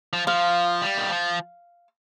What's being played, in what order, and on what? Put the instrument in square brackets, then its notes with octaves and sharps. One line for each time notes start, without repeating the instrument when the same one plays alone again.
[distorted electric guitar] F3
[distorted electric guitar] F3 [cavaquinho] F5
[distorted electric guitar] G3
D#3
F3